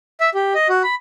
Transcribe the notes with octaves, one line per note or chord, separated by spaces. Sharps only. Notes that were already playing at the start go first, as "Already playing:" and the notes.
E5
G4
D#5
F#4
B5